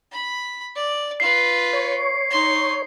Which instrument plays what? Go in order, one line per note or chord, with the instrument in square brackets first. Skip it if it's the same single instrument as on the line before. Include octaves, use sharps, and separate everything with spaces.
[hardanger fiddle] B5
D5
[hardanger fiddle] F4 B4 [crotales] C7
[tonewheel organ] C#5
[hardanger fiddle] D#4 C6